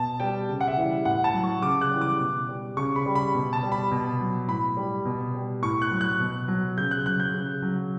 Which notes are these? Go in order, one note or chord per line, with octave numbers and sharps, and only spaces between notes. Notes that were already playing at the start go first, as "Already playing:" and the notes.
Already playing: B2 A5
G3 G5
C#3
F#5
E5
E3 G3
A2 F#5
A5
F#3
C#6
C#3 D6
F#6
E3 G3
D6
B2
G3
C#3 C#6
B5
G3
B5
B2
A5
G3
B5
B2
F#3
A2 B5
G3
B2
G3
A2 C#6
F#6
F#3
F#6
B2
F#3
C#3 G6
F#6
F#3 F#6
G6
C#3
F#3